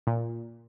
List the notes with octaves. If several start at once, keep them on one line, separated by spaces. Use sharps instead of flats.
A#2